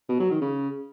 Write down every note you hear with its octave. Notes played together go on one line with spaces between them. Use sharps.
B2
F#3
D#3
C#3